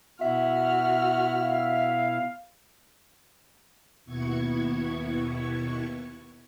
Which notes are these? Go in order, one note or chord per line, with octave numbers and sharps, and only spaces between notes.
B2 E4 F#4 E5 F6
F5
D#2 B2 B3 E4 C#6 G#6